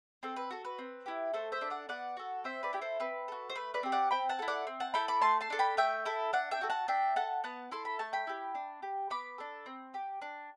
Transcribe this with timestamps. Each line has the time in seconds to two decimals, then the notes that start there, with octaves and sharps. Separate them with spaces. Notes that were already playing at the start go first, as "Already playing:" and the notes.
0.23 C4 A4
0.36 B4
0.51 F#4 A4
0.65 B4
0.79 C4
1.06 E4 G4
1.34 A3 A4 C5
1.52 C5 E5
1.61 D4 A4
1.70 D5 F#5
1.89 B3 D5 F#5
2.17 F#4 A4
2.44 C4 C5 E5
2.63 B4 D5
2.73 E4 G4
2.81 A4 C5
3.00 C4 B4
3.28 F#4 A4
3.50 C5
3.56 A3 B4
3.74 B4 D5
3.83 C4 G4
3.92 D5 F#5
4.11 C4 G5 B5
4.29 F#5 A5
4.39 E4 A4
4.48 D5 F#5
4.67 C4
4.80 F#5 A5
4.94 E4 A4 G5 B5
5.08 B5 D6
5.22 A3 A5 C6
5.41 A5 C6
5.50 D4 A4
5.59 G5 B5
5.77 A3 E5 G5
6.06 E4 A4
6.33 D4 D5 F#5
6.51 E5 G5
6.61 F#4 A4
6.70 F#5 A5
6.88 D4 E5 G5
7.16 A4 F#5 A5
7.44 B3 F#5 A5
7.71 E4 A4 C6
7.85 B5
7.99 A3 A5
8.13 G5 B5
8.27 E4 G4
8.55 D4
8.83 G4
9.10 B3 B5 D6
9.38 D4 A4
9.66 C4
9.94 G4
10.22 D4